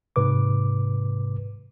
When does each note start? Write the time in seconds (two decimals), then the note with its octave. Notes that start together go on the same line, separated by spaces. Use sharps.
0.16 G#2 C3 B4 D6